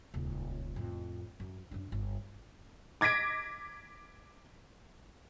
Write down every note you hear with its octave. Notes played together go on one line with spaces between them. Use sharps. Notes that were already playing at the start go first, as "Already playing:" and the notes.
D#1 C#2
F2 A2
F#2
F#2 D4
G1
D6 G#6 A#6 B6 D7